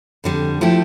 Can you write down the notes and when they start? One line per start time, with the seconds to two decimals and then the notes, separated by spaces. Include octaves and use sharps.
0.24 F2 D3 G3
0.61 F3 A3 E4 G4